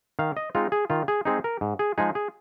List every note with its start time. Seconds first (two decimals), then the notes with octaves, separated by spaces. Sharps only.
0.19 D#3 F5
0.37 D#5
0.55 G#3 C4 D#4 F4
0.72 G#4
0.90 D#3 F4
1.08 G#4
1.25 G#3 C4 D#4 G#4
1.44 A#4
1.61 G#2
1.79 G#4
1.98 F3 G#3 D#4 G#4
2.15 G#4